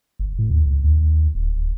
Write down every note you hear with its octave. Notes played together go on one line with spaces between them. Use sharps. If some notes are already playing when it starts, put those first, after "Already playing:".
G1
A2
D#2
C#2
D#2
D1